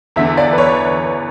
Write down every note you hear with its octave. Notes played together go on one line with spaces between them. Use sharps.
E2 D3 E5
D5
B4
C#5